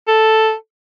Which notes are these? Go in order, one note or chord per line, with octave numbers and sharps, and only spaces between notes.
A4